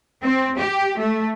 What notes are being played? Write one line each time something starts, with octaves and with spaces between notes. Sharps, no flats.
C4
G4
A3